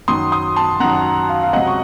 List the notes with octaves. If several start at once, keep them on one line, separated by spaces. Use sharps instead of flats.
F#2 D#3 F#3 C6 D#6
C6 D#6
A5 C6
F#2 D#3 F#3 F#5 A#5
F5
F5
C#2 C3 F#3 D#5 F#5
C#6